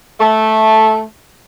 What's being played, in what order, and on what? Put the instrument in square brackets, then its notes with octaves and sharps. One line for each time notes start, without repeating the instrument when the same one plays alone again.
[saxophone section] A3